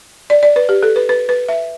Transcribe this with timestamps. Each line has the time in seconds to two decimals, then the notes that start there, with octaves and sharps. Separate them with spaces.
0.30 D5
0.43 D5
0.56 B4
0.69 G4
0.83 A4
0.96 B4
1.09 B4
1.29 B4
1.48 E5